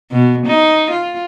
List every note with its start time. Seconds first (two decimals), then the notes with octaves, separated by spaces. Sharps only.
0.11 B2
0.46 D#4
0.90 F4